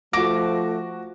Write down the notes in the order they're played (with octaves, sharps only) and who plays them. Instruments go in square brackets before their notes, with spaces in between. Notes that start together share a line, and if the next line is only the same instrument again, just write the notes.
[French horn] F3 [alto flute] A3 [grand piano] F#4 A#6 [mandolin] D6